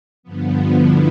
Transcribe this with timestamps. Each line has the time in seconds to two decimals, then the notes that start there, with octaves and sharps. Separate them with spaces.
0.23 G2 D3 F3 B3
0.73 E4